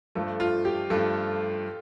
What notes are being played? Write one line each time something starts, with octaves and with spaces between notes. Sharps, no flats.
G2 F3 A3 A4
F4
G4
G2 F3 A3 A4